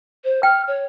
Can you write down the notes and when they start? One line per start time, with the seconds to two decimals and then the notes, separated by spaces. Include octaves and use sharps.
0.24 C5
0.43 G5 F6
0.67 C#5